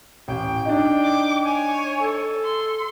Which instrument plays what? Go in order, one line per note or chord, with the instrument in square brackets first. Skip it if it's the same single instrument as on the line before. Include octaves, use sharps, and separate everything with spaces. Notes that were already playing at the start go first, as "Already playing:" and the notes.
[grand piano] A1 [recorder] G5
[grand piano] D4 D#4
[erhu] D6
[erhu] C#5 [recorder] G#5
[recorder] A4
[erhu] C6